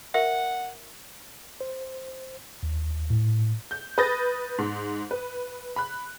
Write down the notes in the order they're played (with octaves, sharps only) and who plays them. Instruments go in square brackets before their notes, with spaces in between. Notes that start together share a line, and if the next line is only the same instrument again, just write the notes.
[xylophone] A#4 E5 [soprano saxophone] F#5
[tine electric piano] C5
D#2
A2
[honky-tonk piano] G6
B4 B5 D#6 G6 A6 A#6
G#2
B4
B5 F#6